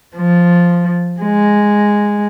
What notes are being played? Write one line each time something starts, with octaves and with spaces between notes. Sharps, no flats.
F3
G#3